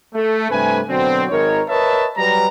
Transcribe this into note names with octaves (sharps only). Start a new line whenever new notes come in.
A3
G2 C3 A3 B4 G#5
B2 D3 F#3 C4
G#1 D#4 A#4 C#5
A#4 B4 C#5 D#5 E5 A5
F#3 G3 B4 A#5